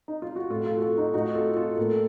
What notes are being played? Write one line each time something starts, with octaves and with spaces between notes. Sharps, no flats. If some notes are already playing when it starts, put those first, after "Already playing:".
D#4
F4
F#4
A2 F4 A4
F4 A4
F#4
F4 A4
D#4 F#4
A2 D#4 F#4
F4 A4
F4 A4
A2 A#3
A4